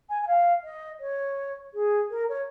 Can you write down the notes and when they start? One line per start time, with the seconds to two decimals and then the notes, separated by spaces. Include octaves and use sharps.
0.09 G#5
0.22 G#5
0.27 F5
0.63 D#5
1.00 C#5
1.74 G#4
2.10 A#4
2.28 C#5